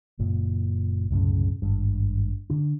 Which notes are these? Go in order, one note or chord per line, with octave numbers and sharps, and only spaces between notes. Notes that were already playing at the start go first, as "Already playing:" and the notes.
F#1 A#2
C2 F#2 A2 C#3
G#1 G2
D3 D4